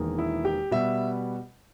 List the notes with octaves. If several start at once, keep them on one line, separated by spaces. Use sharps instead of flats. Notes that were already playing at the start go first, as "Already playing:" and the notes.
Already playing: E1 E2 D#3 A#3
E4
G4
B2 G3 B3 E5